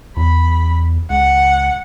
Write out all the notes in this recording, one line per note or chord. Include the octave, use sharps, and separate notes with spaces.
E2 B5
C#2 F#5